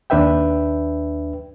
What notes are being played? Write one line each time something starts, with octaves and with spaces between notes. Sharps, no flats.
D#2 D4 B4 E5 G5